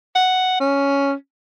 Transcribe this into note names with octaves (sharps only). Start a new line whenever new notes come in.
F#5
C#4